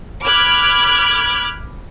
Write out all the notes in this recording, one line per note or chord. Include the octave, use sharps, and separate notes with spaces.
B5 D6 F6 F#6 G#6